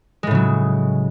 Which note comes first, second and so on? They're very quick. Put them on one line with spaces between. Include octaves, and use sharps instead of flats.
G#3 A2 C#3 F#3